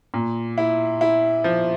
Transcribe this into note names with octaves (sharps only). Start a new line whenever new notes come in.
A#2
E4
E4
F3